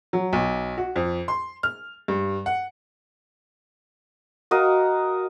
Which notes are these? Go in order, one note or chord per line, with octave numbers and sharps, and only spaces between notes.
F#3
B1
F#4
F2
C6
F6
G2
F#5
F#4 A#4 D#5 F5